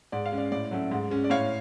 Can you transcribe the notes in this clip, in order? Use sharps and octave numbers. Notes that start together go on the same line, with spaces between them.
G#2 D5
F5
G#3 C#4
D5
A2 D5
F#3 A3 C#4
G#2
G#3 C#4
D5
A2 C#5 F5